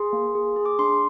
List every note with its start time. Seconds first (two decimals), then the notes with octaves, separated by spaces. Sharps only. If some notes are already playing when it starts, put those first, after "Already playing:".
Already playing: G#4 C6
0.13 A#3
0.35 G#4
0.56 G#4
0.65 D6
0.79 D4 C6